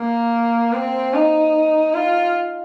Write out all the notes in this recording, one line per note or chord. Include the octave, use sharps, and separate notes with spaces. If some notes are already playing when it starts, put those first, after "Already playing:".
Already playing: A#3
C4
D#4
F4